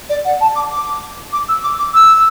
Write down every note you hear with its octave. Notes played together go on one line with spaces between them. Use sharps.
D5
F#5
A5
D6
D6
D6
E6
D6
D6
E6